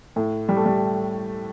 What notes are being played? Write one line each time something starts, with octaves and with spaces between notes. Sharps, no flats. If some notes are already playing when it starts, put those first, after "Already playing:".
A2
G3
A3
G3